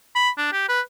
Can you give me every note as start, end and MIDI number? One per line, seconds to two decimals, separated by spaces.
0.15 0.29 83
0.37 0.50 62
0.52 0.67 67
0.68 0.80 71